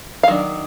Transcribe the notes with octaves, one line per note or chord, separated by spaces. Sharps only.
F5
D#3 F#3 D4